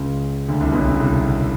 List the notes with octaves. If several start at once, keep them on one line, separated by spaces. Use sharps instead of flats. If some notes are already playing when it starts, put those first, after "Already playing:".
Already playing: C#2 C#3
D2 D3
C2 C3
B1 B2
C3
C#3
C2 C3